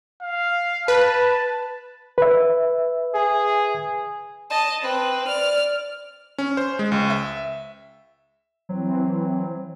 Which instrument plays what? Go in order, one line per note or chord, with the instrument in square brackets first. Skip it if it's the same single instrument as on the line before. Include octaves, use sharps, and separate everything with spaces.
[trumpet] F5
[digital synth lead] B4 [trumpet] A5
[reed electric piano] B4 E5
[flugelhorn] G#4
[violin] D#5 A5
C4 B4
D5 F6
[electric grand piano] C#4
C5
G#3
C#2
E5
[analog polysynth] E3 C4 [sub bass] F#3